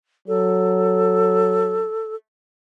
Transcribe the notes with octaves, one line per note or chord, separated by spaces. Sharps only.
F#3 A4